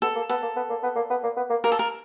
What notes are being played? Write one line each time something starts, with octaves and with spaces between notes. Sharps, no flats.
B3 A4
A#3
B3 A4
A#3
B3
A#3
B3
A#3
B3
A#3
B3
A#3
A#3 A#4
A4
A#4